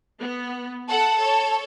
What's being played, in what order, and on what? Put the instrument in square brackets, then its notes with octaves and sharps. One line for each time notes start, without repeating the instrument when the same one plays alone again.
[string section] B3
[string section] A4 F#5 [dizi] A5
[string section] A4 C#5